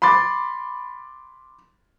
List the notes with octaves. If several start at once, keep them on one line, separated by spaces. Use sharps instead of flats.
B5 C6 D6 A6